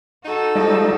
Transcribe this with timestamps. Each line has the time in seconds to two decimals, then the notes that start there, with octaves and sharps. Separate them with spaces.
0.25 D#4 F#4 A4
0.56 F3 G3 G#3 D#4